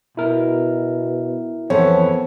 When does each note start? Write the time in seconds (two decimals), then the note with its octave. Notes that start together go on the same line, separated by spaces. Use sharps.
0.17 B2 E4 A#4
1.70 F2 E3 B3 A4 C5 C#5